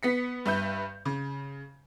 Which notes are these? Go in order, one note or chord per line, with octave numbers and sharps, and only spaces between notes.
B3 B6 C#7
G2 B4 E5 G6
C#3